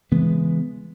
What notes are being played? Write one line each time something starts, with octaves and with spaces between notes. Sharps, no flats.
C#3 E3 G#3 B3